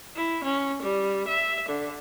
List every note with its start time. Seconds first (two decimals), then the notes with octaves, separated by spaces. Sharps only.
0.15 E4
0.44 C#4
0.82 G3
1.27 E5
1.68 D3